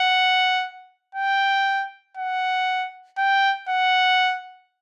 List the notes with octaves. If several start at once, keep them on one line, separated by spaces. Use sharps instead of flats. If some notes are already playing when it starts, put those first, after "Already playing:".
Already playing: F#5
G5
F#5
G5
F#5